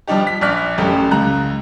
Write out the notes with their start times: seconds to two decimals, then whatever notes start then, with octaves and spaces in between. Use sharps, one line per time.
0.08 F3 G3 D4 D#4 G4
0.27 B6
0.41 A#1 D5 F6 F#6 B6
0.78 A1 F#2 G4 A4
1.11 C#2 A#5 F#6